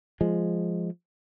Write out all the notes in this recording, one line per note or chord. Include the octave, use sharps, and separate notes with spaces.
F3 G#3